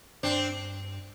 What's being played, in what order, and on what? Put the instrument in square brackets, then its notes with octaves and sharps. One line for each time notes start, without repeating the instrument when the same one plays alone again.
[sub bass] G2 [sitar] C4 D4